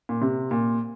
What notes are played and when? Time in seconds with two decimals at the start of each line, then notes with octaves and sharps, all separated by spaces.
0.09 A#2
0.22 C3
0.51 A#2